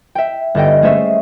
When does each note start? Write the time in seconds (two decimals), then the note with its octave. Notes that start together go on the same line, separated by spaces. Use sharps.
0.15 E5 G5
0.55 G1 A4 D#5 G5
0.82 G#3 A3 C#4 G#4 C5 E5